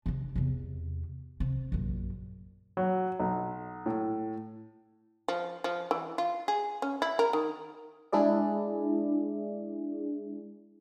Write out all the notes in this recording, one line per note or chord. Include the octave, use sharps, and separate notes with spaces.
C3 D4
E2 C3
C3
A#1 F#2
F#3
B1
A2
F3
F3
E3
F4
G#4
C#4
E4
A#4
D#3
G#3 D4 E4 G#4 D5